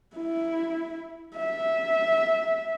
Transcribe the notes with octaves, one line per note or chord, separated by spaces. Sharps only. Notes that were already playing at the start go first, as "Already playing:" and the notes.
E4
E5